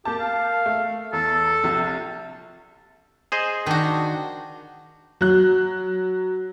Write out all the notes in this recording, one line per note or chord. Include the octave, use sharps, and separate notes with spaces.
A#3 G4 A5
F5
A3
E2 A4
A#1 C3
G#4 C5 D#5
D#3 D4 F#4
F#3 F#6